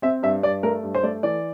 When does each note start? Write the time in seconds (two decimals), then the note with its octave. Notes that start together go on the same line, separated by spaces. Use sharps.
0.02 C4 E5
0.23 G2 E5
0.43 G2 D5
0.63 A3 A#4
0.83 G2
0.95 C5
1.03 A3 D5
1.23 E3 D5